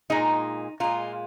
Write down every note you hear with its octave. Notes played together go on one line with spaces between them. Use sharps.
A#2 G#3 D#4
A#2 G#3 F4